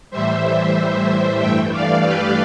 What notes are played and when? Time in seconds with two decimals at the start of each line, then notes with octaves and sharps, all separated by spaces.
0.11 A2 E3 G3 C5 E5
1.38 G2 E3 A3 E5 G5
1.71 D5 F5
2.03 G4 B4